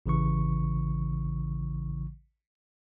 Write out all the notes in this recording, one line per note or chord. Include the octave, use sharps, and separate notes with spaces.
A1 C#3 E3 C#6